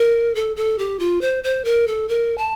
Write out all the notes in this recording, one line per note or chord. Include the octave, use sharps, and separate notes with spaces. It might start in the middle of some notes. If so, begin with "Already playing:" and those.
Already playing: A#4
A4
A4
G4
F4
C5
C5
A#4
A4
A#4
A5